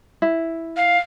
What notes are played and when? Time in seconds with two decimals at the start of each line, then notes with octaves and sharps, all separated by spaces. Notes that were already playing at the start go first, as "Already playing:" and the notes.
0.22 E4
0.77 F5